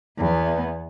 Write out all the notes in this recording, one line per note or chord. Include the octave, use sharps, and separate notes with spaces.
E2 B3